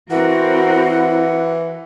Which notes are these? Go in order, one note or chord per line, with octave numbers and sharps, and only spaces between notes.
E3 C4 E4 F#4 A#4 F#5